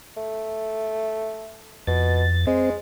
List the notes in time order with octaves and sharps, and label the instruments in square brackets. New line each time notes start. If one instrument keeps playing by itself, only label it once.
[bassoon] A3
[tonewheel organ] F2 A6 [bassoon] B2
[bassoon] G#3 [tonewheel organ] C4 C5